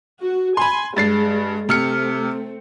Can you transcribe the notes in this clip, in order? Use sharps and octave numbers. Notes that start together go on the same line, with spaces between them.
F#4
G#5 B5 C6
G2 G#3 A6 C7
C3 A3 C4 F6 C#7